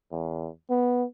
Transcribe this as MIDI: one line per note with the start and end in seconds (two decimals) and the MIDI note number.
0.12 0.48 40
0.70 1.05 59